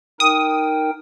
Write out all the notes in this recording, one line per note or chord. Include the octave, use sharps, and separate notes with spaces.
D#4 A#4 G5 D#6